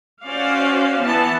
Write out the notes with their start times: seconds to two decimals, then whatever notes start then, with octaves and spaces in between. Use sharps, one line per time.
0.24 C#4 F#4 C5 D5 F5
1.02 E3 B3 A5